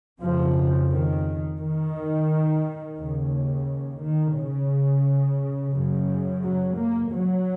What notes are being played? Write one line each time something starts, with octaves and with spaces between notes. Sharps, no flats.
F2 C#3 F3
D#3
D#3
D#2 C#3
D#3
C#3
F#2 C#3
F#3
A#3
F#3